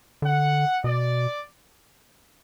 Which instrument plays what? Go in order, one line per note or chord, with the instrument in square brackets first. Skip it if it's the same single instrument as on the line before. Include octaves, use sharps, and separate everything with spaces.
[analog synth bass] D3 [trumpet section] F#5
[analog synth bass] B2 [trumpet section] D5